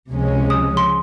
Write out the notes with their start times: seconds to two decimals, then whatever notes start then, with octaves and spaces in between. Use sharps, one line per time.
0.10 C#2 C3 F3 G#3 C#4
0.50 D#6
0.77 C6